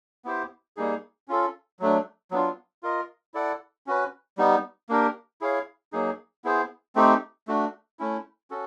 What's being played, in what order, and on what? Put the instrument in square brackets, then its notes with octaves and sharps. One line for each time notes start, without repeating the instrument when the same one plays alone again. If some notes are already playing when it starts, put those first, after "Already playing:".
[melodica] B3 E4 G4 C5
G3 A#3 D#4 G#4
C#4 F4 A4
F#3 A3 D4
F#3 B3 D4 F4
F4 A#4 D#5
E4 A4 D5 F#5
C#4 F#4 B4
G3 B3 D#4
A#3 D4 G4 A#4
E4 G#4 C#5 F5
F#3 A#3 D#4 G#4
B3 E4 G#4 C5
A3 C4 D#4 G4
A3 D4 F#4
A3 C#4 E4
C#4 F#4 A4